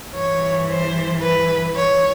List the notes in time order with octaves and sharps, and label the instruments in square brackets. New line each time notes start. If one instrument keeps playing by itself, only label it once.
[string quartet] G2 E3 C#5
C5
B4
C#5